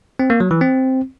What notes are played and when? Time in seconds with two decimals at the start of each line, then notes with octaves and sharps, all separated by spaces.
0.19 C4
0.30 A#3
0.40 F#3
0.51 E3
0.61 C4